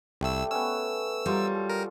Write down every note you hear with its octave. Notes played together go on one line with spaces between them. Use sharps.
C2 G3 A3 D5 E6
B3 C#4 E6
F#3 G3 F4 A#4
A4
A#4